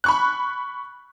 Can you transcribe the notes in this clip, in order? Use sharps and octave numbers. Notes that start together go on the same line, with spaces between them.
B5 C#6 F#6